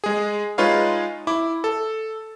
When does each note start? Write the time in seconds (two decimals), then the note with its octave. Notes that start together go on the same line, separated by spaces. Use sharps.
0.04 G#3 G#4
0.58 G#3 D#4 F4 B4 C#5 F5
1.27 E4 D6
1.64 A4